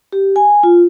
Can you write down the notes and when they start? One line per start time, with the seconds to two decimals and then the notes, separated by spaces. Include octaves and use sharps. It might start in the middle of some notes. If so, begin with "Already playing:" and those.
0.12 G4
0.36 G#5
0.63 F4